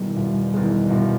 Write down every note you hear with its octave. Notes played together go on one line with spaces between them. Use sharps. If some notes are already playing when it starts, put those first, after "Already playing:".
Already playing: E1 E2 D#3 G3 G#3
E1
E2 D#3 G#3
E1